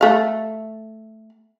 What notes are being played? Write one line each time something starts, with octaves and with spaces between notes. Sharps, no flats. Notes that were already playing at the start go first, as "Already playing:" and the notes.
A3 F5